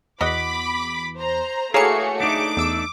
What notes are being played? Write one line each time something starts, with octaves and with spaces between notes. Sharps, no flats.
E2 F#4 D#5 F#5 B5 D6 B6
C5 A#5
E3 A3 A#3 F#4 G#4 C#5 F5 C#7
A3 D4 D#4 D6
E2 E6 D7